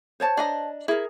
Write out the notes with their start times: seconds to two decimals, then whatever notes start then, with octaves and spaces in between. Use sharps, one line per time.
0.20 C5 C#5 A5
0.37 D4 D#5 A#5
0.88 E4 G#4 A#4